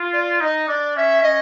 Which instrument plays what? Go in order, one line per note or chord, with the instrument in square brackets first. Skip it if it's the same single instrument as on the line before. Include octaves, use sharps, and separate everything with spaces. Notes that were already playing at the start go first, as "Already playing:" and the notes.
Already playing: [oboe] F4
[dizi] D5
[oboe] D#4 [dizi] D#5
[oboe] D4 [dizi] D5
[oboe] C#4 [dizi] E5
[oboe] C#4 [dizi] D#5